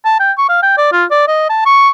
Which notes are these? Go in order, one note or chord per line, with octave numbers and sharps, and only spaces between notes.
A5
G5
C#6
F5
G5
D5
F4
D5
D#5
A5
C#6